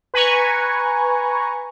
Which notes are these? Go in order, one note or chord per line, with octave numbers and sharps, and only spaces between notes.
B4 G#5 A#5 C#6